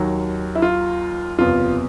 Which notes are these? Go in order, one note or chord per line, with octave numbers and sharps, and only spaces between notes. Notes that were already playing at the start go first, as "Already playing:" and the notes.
Already playing: D#2 D#3 F#3
E4
F4
F#1 E2 C3 F4